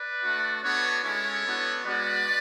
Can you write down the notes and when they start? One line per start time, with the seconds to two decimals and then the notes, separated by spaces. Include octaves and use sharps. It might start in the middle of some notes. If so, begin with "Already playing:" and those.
Already playing: B4 D5
0.23 A3 D4 F#4
0.63 B3 D4 F#4 A4 C#5
1.03 G#3 C#4 E4 A4 C#5
1.44 B3 D4 F#4
1.84 G#3 B3 F#4 B4 D5